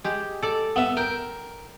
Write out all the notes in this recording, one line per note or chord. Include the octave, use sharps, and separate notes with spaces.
G#3 G4
A4 D5
B3 E5
A#4 G5